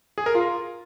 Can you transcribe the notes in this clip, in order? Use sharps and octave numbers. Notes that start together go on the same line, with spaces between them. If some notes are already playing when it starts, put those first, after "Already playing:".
G#4
A#4
F4